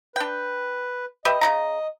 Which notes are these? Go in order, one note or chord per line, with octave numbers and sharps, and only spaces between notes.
D4 B4 G5
G4 B4 D#5 E5
C#3 D#4 A#5